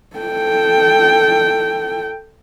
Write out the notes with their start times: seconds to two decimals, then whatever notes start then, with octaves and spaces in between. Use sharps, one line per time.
0.17 A4 G5